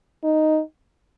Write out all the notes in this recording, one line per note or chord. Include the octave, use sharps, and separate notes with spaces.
D#4